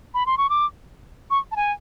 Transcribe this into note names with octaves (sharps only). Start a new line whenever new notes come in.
B5
C6
C#6
D6
C#6
A5
G#5